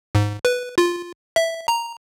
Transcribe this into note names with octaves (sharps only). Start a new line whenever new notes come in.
G#2
B4
F4
E5
A#5